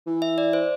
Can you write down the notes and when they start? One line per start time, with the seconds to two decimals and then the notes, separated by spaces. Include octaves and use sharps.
0.06 E3
0.22 E5
0.38 D5
0.53 C5